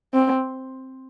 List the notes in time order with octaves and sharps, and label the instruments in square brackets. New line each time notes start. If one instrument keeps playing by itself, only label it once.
[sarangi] C4